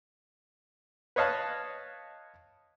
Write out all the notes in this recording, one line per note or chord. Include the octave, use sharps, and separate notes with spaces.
B4 C#5 D#5 F5 A5 F#6